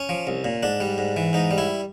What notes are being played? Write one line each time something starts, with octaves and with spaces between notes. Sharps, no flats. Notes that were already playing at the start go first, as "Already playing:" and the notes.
Already playing: C#4
F3
C2
A#2
G#2 D4
G3
G#2
E3
G#2 D#4
G3
E4